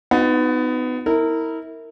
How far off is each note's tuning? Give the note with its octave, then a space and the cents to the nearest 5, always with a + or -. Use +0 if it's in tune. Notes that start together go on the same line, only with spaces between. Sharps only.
B3 +25 D#4 +0 F#4 -35
E4 -30 A#4 -25